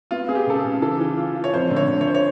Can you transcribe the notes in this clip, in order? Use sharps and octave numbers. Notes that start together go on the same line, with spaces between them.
B3 F4
B3 G#4
G4
C#3 A4
G#4
C#3
E3 A4
E3
F4
F4
C#5
F2 C5
D3
C#5
D3
C#5
C5
C#5